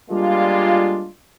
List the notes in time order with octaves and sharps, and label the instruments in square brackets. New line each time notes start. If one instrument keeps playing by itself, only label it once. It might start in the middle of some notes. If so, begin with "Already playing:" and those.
[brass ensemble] G3 G#3 A#3 D4 F4